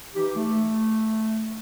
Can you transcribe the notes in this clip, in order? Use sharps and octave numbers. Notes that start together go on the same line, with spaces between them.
E3 D#4 G4
A3